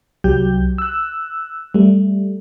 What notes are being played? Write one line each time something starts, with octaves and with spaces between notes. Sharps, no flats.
C2 F#3 G4 G6
E6 F#6
G3 A3